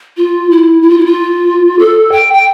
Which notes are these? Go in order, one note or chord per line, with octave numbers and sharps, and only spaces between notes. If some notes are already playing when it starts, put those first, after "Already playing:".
F4
E4
E4
F4
E4
F4
A4
G5
G5